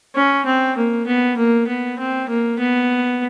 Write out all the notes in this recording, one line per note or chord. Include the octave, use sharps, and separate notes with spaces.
C#4
C4
A#3
B3
A#3
B3
C4
A#3
B3